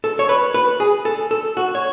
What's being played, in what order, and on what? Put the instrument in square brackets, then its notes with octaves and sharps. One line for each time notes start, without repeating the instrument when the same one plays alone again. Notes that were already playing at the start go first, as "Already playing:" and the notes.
[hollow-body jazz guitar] A4
C#5
B4
B4
G#4
A4
A4
F#4
C#5